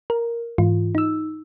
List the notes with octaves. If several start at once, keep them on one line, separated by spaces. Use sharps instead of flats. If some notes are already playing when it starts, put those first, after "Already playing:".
A#4
G#2 E3 F4
D#4 E6